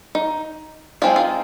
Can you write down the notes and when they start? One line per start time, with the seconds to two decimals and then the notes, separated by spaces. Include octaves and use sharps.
0.15 D#4
1.02 G#3 C4 D#4 F4
1.16 F4